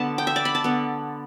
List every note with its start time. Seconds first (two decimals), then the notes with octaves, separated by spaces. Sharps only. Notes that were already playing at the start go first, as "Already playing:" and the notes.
Already playing: B2 D3 B3 A5 B5
0.18 G5
0.27 E5
0.36 D5
0.45 B5
0.55 A5
0.64 D3 B3